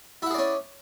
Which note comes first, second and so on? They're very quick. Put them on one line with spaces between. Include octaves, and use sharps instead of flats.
E4 F#5 G#4 D5 C#4